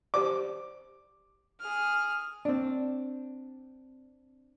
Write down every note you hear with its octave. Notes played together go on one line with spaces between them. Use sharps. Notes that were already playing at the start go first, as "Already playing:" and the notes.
G4 C5 D5 D6
G#4 F6
C4 D4